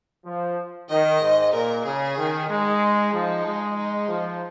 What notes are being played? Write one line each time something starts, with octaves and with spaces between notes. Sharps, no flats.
F3
D#3 D#5
G#2
A#2 A#4
C#3 G#4
D#3
G#3 D#4
F3 D#4
G#3
D#4
F3